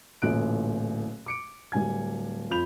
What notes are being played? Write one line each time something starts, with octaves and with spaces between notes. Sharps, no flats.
D1 A1 A#2 A3 F#6 D7
D6 C#7 D7
D1 G3 G#5 G#6
F2 F4 B5 G6 F7